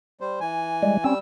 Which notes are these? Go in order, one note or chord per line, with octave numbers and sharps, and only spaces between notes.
G3 C5
E3 G#5
G3 G#3
G3 C4 C#4 E6